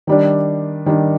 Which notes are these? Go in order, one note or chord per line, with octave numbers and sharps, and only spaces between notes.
D#3 G3 D4
D#3 G3 D4